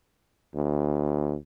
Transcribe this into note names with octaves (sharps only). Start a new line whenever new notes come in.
D2